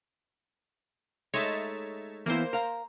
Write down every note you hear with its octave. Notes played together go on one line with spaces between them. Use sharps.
G#3 A3 D#4 C#5 E5 A5
E3 A#3 B3 E4 C5
A#4 F5 A#5